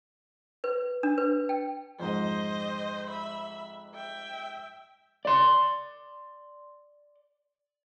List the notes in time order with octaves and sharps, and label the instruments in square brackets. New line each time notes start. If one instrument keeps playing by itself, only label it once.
[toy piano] B4
D4
B4
G5
[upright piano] F2 G#2 [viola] C5 D#5
[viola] E5 B5
E5 G5
[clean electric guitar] D5 C6